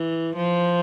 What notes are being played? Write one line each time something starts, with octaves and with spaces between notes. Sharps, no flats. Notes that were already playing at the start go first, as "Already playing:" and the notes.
Already playing: E3
F3